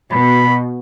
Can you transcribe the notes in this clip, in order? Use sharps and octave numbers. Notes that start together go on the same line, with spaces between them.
B2 B5